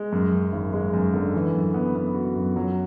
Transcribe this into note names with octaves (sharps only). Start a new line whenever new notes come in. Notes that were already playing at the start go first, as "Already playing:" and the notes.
Already playing: G#3
F#2
F#2
G#1
G#3
F#2
D3
E3
F#2
B3
B3
F#4
F#2
F#3